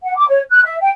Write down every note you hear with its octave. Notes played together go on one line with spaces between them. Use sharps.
F#5
D6
C#5
F#6
E5
G5